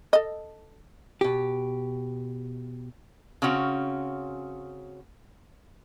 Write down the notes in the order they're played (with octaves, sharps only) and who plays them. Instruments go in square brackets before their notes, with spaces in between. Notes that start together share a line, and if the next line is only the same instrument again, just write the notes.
[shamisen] A4 D#5
[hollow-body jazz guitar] B2 G4
[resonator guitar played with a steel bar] C#3 C4 C#4 F#4